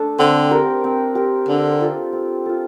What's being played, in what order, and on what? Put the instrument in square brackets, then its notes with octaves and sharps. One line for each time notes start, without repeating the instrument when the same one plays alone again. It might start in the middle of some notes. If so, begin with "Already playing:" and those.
Already playing: [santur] A3 D4 A4
[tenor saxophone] D3 [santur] C4
[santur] G4 A#4
C4
G4 A#4
[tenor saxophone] D3 [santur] C4
[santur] F4 A4
C4
F4 A4